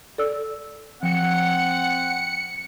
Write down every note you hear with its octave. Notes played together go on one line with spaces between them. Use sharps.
A4 D5 E6
F3 C4 F#5 C#7